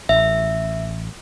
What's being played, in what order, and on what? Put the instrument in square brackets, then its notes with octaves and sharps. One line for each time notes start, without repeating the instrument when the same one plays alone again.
[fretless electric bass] A1 [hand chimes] E5